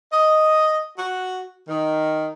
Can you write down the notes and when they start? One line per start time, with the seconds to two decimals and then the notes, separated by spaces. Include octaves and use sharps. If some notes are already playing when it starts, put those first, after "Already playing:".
0.13 D#5
0.98 F#4
1.68 D#3